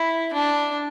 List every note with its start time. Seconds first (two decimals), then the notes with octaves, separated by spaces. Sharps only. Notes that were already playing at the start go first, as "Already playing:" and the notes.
Already playing: E4
0.33 D4